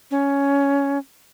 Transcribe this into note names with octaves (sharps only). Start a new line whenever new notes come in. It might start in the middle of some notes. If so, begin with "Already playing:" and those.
C#4